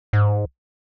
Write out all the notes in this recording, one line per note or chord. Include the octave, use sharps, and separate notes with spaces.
G#2